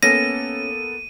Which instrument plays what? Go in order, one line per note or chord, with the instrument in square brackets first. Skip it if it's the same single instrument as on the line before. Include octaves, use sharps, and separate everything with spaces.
[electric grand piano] A#3 B3 A4 [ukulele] C#4 [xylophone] A#6 [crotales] D#7